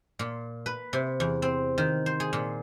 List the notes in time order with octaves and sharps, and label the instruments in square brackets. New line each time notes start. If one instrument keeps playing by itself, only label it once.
[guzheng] A#2
B4
C3
E2
C4
D#3
C5
G#4
A#2